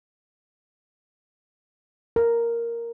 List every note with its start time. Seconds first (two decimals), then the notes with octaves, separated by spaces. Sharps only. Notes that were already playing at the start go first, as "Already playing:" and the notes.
2.16 A#4